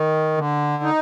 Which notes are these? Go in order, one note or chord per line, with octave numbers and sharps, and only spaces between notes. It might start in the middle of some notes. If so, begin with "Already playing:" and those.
Already playing: D#3
D3
D#4